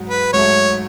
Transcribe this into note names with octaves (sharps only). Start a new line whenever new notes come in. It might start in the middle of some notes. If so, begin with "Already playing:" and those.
Already playing: G#2 F#3
B4
G#2 F#3 A3 C#5